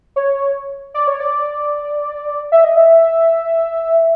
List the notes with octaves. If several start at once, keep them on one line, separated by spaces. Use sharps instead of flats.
C#5
D5
C#5
D5
E5
D#5
E5